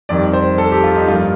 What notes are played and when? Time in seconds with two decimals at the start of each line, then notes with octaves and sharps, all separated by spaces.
0.09 F2 D#3 G3 D5
0.33 C5
0.58 A4
0.71 G4
0.84 F4
0.96 D#4
1.08 G2 F3 A#3 F4